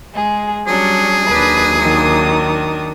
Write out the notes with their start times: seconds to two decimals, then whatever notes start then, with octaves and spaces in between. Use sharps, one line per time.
0.13 G#3 G#4
0.67 F#3 G3 C#4 D4 G#4
1.28 D#2 F#3 D4 B4 D#6
1.80 D#3 D4